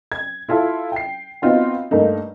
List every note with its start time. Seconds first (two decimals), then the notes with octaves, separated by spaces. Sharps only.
0.12 G#6
0.49 E4 F4 A4 E5
0.92 G5 C7
1.42 B3 C4 D#4 F4 F#4
1.91 G2 A3 A#3 D#4